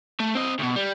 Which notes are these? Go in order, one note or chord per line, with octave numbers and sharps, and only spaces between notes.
A3
C4 D#5
D2 B2
G3